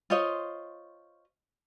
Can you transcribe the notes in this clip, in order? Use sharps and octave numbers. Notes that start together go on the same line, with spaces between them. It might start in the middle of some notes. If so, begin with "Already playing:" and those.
F4 C5 C#5 D#5